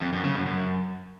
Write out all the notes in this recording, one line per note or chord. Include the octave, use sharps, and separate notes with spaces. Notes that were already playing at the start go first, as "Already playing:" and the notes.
F2
F#2
C#3
F#2
F#2